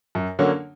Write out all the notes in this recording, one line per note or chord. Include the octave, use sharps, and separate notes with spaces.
F#2
D3 F#3 A#3 C#4